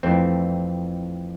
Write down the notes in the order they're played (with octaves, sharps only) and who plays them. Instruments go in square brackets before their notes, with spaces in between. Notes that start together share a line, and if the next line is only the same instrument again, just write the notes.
[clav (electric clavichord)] F2 E3 A3 C4